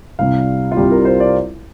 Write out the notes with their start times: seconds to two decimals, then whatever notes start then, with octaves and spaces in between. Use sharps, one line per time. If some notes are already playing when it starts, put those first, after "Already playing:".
0.19 C2 C3 G3 F5
0.72 F4
0.77 C2 C3 G3 G4
0.91 A#4
1.05 C5
1.20 D5